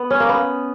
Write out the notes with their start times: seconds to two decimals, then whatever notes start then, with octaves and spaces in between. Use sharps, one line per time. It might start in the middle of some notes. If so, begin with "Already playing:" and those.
Already playing: B3
0.10 C#4
0.20 A#3
0.29 B3